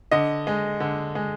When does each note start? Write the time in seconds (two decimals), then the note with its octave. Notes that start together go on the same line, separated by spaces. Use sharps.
0.11 D3 D#5
0.47 G#3
0.80 D3
1.15 G#3